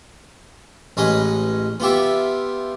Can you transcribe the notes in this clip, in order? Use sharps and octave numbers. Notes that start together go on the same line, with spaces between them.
A1 G#3 C#4 B4 D#5
B3 F4 G4 E5